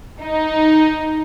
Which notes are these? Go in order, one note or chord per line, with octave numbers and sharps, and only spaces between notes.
D#4